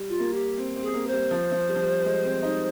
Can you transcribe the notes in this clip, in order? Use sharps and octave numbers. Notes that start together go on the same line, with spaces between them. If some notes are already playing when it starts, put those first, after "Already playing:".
Already playing: G3
F4
A#3
G4
C4
C4
G#4
C4
A#3
C5
G3
F3
F3
G3
F3
G3
G#3
C4
D#4